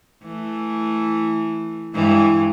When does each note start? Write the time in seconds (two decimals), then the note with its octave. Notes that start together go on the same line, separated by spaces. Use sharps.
0.23 E3 A3
1.93 G2 E3 G#3